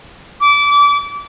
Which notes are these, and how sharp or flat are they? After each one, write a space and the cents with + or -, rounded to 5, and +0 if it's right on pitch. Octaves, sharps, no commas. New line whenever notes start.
D6 -25